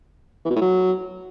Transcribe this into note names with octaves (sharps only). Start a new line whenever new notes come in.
E3
B2
A2
F#3